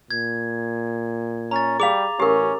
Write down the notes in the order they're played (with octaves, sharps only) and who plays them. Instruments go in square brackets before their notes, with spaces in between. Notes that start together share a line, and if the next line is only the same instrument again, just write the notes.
[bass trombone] A#2 [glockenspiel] G#6
[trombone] C#4 [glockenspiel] A#5 A6
[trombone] G3 [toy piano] G#4 F5 [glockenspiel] D6 F7
[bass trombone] A1 [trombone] C#4 [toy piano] G4 A#4